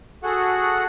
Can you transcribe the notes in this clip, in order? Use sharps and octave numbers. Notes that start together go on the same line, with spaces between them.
F#4 G#4 A4 F#5